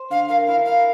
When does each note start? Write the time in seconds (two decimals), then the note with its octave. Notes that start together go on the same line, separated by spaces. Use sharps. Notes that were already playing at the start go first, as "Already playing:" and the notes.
Already playing: C5
0.10 D3 F5
0.29 A#4 F5
0.47 E4 F5
0.65 A#4 F5